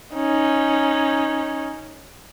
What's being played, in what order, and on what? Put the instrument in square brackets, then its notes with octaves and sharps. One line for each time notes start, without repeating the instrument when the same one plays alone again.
[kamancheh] C#4 D#4